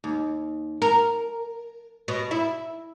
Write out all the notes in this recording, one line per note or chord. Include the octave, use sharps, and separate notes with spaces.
D#2
A#4
B2
E4